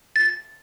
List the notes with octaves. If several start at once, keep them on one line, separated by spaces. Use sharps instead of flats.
A6